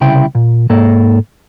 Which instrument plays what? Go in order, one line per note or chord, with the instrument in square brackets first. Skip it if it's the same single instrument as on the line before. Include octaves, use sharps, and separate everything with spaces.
[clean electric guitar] C2 C#3 E4 G5
A#2
G#2 A#3 A4